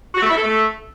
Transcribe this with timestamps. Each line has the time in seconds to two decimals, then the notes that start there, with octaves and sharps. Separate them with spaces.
0.15 F#4
0.22 A3
0.29 E4
0.36 A4
0.43 A3